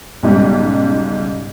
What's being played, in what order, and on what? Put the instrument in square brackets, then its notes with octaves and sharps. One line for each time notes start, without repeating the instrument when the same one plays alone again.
[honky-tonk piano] B1 G#2 C#3 G3